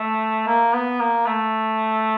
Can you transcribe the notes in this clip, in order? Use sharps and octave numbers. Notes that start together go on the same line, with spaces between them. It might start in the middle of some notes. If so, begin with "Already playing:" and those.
Already playing: A3
A#3
B3
A#3
A3